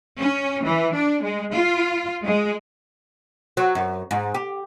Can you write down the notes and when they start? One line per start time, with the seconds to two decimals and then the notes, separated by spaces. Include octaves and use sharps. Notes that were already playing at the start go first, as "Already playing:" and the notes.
0.19 C#4
0.64 E3
0.94 D4
1.23 G#3
1.52 F4
2.25 G#3
3.57 F#3
3.75 F#2
4.11 G#2
4.34 G4